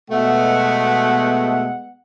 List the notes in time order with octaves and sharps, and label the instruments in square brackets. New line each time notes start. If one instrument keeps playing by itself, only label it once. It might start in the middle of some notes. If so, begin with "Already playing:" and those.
[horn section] B2 A3 [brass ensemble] G#3 B3 F#5